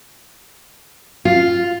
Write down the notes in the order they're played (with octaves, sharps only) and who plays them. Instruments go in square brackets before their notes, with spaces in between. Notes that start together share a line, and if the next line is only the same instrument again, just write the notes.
[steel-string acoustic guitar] F4